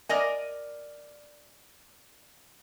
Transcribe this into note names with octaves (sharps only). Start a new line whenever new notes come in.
A#4 D5 D#5 G#5